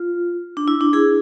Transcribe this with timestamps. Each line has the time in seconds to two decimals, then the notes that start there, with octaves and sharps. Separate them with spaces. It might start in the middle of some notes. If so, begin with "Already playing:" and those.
Already playing: F4
0.57 D4
0.68 E4
0.81 D4
0.93 E4 G#4